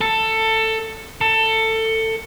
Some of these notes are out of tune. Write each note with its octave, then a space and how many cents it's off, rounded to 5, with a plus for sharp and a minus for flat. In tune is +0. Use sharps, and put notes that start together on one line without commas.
A4 +15
A4 +20